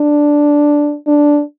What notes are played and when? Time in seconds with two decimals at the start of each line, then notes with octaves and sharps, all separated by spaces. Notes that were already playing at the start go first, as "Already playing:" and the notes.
Already playing: D4
1.08 D4